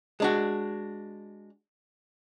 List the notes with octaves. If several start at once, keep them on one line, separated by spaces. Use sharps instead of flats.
G#3 D4 F#4